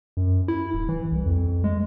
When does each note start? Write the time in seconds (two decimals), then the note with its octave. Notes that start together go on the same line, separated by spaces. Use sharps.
0.17 F#2
0.48 E4
0.73 D1
0.89 E3
1.12 C2
1.26 F2
1.64 G#3